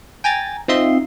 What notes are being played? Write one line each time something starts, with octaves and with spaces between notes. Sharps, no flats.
G5 G#5 A#5 A6
C4 D#4 F4 D#5 E5 C6